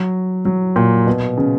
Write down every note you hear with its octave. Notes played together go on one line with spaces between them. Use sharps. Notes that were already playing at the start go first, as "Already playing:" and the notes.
Already playing: F#3
F#3
A#2
B2
C#3